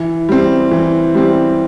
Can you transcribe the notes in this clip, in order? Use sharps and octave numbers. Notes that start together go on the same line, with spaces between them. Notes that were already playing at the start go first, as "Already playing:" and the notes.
Already playing: E3
G3 C4
E3
G3 C4